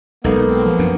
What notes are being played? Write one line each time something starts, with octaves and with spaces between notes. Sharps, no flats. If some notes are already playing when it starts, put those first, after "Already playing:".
B1 G#3 A#3 B3 D#4 A4
C4
F3
F#2 D4